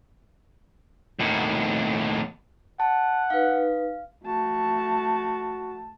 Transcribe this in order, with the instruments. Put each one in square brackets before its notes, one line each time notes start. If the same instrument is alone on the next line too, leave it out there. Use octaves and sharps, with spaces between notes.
[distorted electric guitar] D#2 A2
[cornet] F#5 [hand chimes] A5
[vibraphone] D#4 B4 [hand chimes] F5
[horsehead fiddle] A3 A5 [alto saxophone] F#4